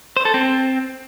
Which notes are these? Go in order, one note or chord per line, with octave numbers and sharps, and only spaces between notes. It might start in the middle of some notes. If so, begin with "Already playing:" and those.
C5
A4
C4